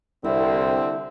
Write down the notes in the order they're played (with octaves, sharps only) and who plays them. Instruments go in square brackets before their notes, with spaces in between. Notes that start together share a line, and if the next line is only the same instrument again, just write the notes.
[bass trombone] C2 [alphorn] D3 [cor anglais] C4 [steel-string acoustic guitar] E4